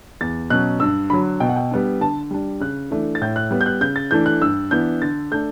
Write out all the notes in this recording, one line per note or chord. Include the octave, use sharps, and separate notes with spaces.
E2 A6
B2 F#3 C#4 F#6
G2 E6
D3 F#3 B5
B2 G5
F#5
G5
G3 B3 D4
D3 A5
G3 D4
C#3 F#6
E3 A3 D4
A6
A2 G6
F#6
G3 B3
G6
F#6
C#3 G6
A6
E3 A3 D4 G6
F#6
G2 E6
E3 B3 D4 G6
D3 A6
A3 D4 G6